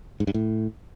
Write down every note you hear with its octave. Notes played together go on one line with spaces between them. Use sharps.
G#2
G2
A2